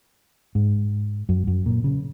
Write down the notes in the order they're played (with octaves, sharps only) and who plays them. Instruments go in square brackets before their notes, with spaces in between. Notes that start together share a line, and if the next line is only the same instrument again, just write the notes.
[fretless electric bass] G#2
F#2
F#2
A#2
C#3